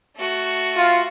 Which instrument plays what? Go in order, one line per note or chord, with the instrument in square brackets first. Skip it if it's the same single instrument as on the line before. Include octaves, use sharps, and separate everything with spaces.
[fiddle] A3 F#4
[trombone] F4